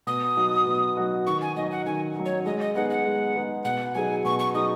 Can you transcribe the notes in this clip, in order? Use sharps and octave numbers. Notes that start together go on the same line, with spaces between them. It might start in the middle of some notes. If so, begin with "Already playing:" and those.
B2 D#6
F#3 D#4 F#4
B2
F#3 D#4 F#4
D#3 C#6
G#5
F#3 D#4 D#5
F#5
D#3 G#5
F#3 D#4
C#5
G#3 D#5
D#5
B3 D#4 G#4 F#5
F#5
G#3
B3 D#4 G#4
B2 F#5
F#3 D#4 G#4 G#5
B2 C#6
C#6
F#3 D#4 G#4 D#6